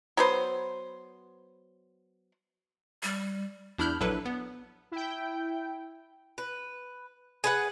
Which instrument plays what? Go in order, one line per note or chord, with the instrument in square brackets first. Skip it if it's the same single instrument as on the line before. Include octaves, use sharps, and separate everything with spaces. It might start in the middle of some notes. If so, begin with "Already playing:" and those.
[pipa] F#3 B3 C5
[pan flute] G3
[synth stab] E2 D4 E4 B5 F6 G6
A#1 F#3 D4 E4 A4 B4
B3
[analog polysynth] E4 G5
[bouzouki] B4
G#4 B4 F#5